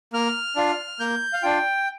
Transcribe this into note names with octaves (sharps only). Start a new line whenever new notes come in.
A#3 F6
D4 F4
A#3 G6
F5
D4 F4 G5